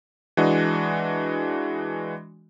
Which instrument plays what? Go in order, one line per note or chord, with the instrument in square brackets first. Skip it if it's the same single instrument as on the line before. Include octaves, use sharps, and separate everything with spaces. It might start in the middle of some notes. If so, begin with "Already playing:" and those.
[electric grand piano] E3 G#3 D4 F#4 D#5